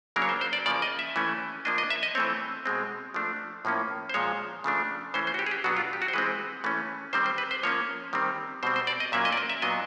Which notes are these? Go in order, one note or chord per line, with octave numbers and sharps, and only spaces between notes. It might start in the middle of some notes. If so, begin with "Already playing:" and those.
C#3 F#3 A#3 D4 A#4
C#5
C5
C5
D5
C#3 F3 A#3 D5
D#5
E5
E3 A3 C#4
F3 A#3 D4 D#5
D#5
E5
D#5
E3 A3 C4 C#5
B2 G#3 C4
F3 A3 D4
A2 F3 A#3 C#4
C5
A#2 F3 G#3 C#5
C#3 F3 A3 D4
E3 A3 C#4 C5
C5
F#4
G4
G#4
G4
B2 F#3 B3 D4 F#4
F4
G4
F#4
C5
E3 G#3 C4 B4
E3 A3 C#4
D#3 G3 C4 C5
C5
B4
C5
F3 A#3 C#4 C#5
D#3 G3 C4
B2 G3 C4 C5
C5
D5
D#5
A#2 F#3 A#3 C#4 E5
D#5
D5
D#5
E5
A#2 F#3 B3 D4 D#5